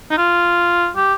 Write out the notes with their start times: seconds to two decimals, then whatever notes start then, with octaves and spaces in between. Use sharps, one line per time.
0.11 D#4
0.18 F4
0.96 G4